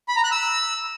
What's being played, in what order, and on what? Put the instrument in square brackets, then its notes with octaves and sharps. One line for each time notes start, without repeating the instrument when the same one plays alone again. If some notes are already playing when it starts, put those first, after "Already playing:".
[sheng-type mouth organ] B5
A#5
F#6
E6